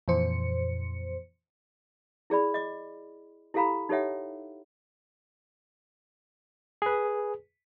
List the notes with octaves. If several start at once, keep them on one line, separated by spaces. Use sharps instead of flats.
F2 A#2 E3 C5 C#7
E4 G#4 D5 B5
D#5 D6
E4 G4 A4 F5 A#5 B5
D#4 G4 A4 C#5 E5 F#5
G#4 B4